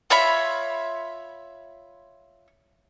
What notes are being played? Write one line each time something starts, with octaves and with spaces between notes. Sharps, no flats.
F4 C#5 E5 B5